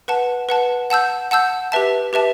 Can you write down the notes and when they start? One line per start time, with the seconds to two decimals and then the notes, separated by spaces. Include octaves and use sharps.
0.08 B4 F#5 A5
0.49 B4 F#5 A5
0.90 F#5 A5 E6 G6
1.31 F#5 A5 E6 G6
1.72 G4 B4 E5 A5
2.13 G4 B4 E5 A5